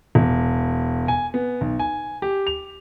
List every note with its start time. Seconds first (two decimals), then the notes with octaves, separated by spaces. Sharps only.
0.15 E1
1.08 G#5
1.34 B3
1.61 B1
1.79 G#5
2.22 G4
2.47 F7